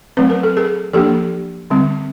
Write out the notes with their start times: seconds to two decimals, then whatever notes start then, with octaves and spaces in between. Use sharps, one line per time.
0.17 F#3 A3 C4 B4
0.30 A#4
0.43 A4
0.57 G#4 A#4
0.93 F3 A#3 D4 G4 A4
1.70 D3 G3 C4